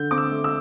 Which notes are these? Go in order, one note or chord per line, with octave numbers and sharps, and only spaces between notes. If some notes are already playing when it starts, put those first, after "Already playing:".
Already playing: D3 G6
C4 D6
E6
A3
E6